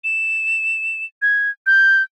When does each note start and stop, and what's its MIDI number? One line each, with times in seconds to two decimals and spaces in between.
0.04 1.05 100
1.22 1.50 92
1.67 2.03 91